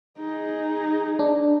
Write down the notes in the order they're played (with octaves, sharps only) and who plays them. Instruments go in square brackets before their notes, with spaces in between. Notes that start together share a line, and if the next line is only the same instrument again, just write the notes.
[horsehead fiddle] D#4 G#4
[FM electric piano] D4